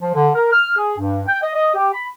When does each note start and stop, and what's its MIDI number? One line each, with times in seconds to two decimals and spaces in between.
0.02 0.13 53
0.15 0.30 50
0.35 0.52 70
0.53 0.73 89
0.77 0.95 68
0.99 1.21 43
1.27 1.39 79
1.43 1.52 75
1.55 1.74 75
1.75 1.90 67
1.94 2.06 83